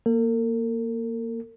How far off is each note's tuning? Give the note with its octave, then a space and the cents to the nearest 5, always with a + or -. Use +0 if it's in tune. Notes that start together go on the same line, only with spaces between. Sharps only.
A#3 +0 A#4 -45